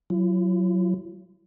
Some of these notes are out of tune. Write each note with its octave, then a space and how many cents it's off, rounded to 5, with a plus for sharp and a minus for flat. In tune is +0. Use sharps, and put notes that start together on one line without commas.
F#3 +0 E4 +45